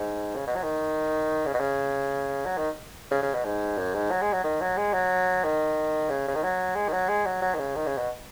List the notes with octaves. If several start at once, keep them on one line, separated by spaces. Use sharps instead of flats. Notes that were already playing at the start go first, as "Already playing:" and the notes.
Already playing: G#2
C#3
B2
F#3
D#3
C#3
B2
C#3
F#3
D#3
C#3
C#3
B2
G#2
F#2
G#2
F#3
G#3
F#3
D#3
F#3
G#3
F#3
D#3
C#3
C#3
D#3
F#3
G#3
D#3
F#3
G#3
F#3
F#3
D#3
C#3
D#3
C#3
B2